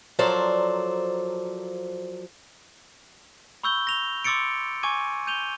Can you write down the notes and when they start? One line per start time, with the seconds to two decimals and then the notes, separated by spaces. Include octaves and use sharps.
0.19 F3 F#3 A4 A#4 C5 D5
3.63 B5 C#6 E6 G6 G7
3.87 A#6 F7 G7
4.24 C6 D6 E6 A6 C#7 D7
4.83 G#5 C#6 D6 G#6 D#7
5.27 G6 D#7 F7 G7